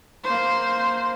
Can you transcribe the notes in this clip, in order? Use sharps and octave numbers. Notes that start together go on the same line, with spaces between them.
A#3 C5